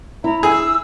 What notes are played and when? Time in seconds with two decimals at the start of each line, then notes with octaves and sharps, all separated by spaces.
0.24 E4 A#5
0.43 G#4 E6